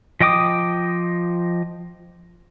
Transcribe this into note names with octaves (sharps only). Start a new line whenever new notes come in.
F3 D#5 G5 D6 D#6